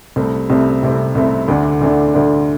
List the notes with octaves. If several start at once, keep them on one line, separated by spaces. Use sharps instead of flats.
C2 C3 A3 C4
C2 C3 A3 C4
C2 C3 A3 C4
C2 C3 A3 C4
D2 D3 A3 D4
D2 D3 A3 D4
D2 D3 A3 D4